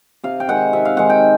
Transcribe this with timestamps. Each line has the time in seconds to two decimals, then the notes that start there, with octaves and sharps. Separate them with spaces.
0.23 C3 F5
0.40 G5
0.48 D#3 G#3 F#5
0.73 C3 E5
0.85 F5
0.97 D#3 G#3 F#5
1.10 G5